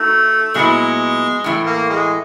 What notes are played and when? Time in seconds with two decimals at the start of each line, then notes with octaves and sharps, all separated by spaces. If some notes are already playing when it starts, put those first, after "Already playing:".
Already playing: A3 D#4 F#4 A4
0.54 A#2 F#3 G#3 B3 E4
1.44 A2 E3 A3
1.66 A#3
1.90 G#3